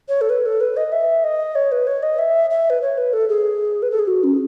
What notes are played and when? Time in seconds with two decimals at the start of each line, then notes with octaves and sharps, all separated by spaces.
0.09 C#5
0.21 A4
0.30 B4
0.46 A4
0.61 B4
0.77 D#5
0.92 E5
1.24 D#5
1.55 C#5
1.72 B4
1.87 C#5
2.03 D#5
2.19 E5
2.50 E5
2.70 B4
2.82 C#5
2.98 B4
3.13 A4
3.29 G#4
3.83 B4
3.91 A4
3.99 G#4
4.07 F#4
4.24 C#4